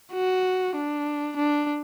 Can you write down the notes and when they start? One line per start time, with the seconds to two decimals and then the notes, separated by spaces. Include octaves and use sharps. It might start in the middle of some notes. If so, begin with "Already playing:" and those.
0.13 F#4
0.76 D4
1.37 D4